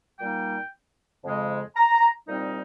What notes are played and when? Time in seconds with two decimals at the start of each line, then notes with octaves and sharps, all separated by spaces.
0.19 A#2 G3 A#3 D#4 G5
1.24 F2 C#3 G#3
1.76 A#5
2.28 C2 A#2 G3 C4 D#4